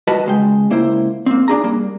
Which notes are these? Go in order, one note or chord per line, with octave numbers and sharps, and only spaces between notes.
G3 F#4 B4 D#5 A5
C#2 G#3 G5
C#2 A#3 E4 C5
A#3 C4
D4 G#4 A#5
G3 A#3